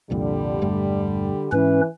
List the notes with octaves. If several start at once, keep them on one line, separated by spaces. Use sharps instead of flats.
C2 F2 A#2 D3 G3
E1 G2 A3
G#2 E3 C#4 B4